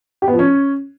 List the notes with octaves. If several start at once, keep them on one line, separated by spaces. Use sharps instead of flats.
G4
B3
F3
C#4